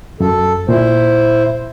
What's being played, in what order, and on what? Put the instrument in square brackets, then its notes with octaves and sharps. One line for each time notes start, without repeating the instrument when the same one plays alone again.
[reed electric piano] F#2 [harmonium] A4
[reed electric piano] A#2 [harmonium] E4 C5